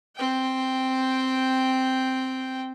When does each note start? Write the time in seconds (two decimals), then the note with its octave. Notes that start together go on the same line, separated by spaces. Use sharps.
0.16 C4 G5